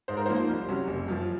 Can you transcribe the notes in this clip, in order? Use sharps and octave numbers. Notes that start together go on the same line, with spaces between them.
G#2 C5
A#4
F3 A#3 D#4 C5
C2
C3 F#3 C#4
F#1
F#2 F3